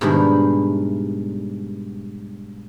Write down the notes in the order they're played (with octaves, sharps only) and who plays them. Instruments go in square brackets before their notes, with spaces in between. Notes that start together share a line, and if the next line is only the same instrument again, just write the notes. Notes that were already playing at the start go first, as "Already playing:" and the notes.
[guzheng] G#2 B2 D#3 G3 D4 E4